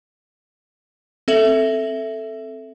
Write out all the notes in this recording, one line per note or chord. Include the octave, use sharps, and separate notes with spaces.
C4 A4 E5 E7 F#7